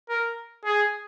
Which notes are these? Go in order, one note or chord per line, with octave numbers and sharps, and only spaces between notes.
A#4
G#4